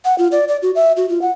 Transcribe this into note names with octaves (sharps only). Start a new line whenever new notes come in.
F#5
F4
D5
D5
F#4
E5
F#4
F4
F#5